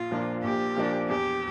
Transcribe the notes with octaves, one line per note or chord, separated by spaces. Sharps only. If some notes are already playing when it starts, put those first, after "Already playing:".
Already playing: A#1 F4
A#2 F3 A#3 D4
A#1 G4
A#2 F3 A#3 D4
E2 G4